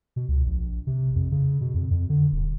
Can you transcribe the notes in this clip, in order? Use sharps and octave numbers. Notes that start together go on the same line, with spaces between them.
B2
C#2
A#1
C3
F2
C#3
B2
F2
F2
D3
D#1